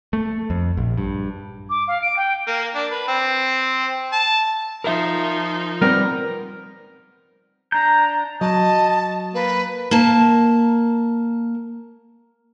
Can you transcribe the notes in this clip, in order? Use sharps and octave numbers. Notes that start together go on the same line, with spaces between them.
A3
F2
A#1
G2
D6
F5
D7
G5
A#3
D4
B4
C4
A5
F3 D#4 A#4 E5
G3 B3 C4 A#4
D4 A#5 G6
F#3 D#5 A5
A#3 B4
A#3 A5